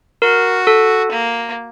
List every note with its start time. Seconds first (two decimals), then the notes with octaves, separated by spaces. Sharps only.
0.22 F#4 A#4
0.67 A4
1.12 A#3